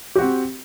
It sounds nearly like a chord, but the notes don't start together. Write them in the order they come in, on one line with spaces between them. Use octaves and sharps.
G4 F#4 C4